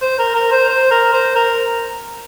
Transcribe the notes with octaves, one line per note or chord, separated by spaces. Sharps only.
C5
A#4
A#4
C5
C5
A#4
C5
A#4